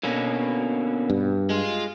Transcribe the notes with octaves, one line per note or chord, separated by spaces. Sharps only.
B2 D3 A#3 C#4
G2
G#3 F4